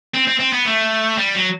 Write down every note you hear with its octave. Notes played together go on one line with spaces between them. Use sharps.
C4
C4
C4
B3
A3
G3
F#3